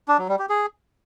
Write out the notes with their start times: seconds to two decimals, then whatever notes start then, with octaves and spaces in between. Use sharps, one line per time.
0.08 D4
0.18 F#3
0.29 G3
0.39 G4
0.49 G#4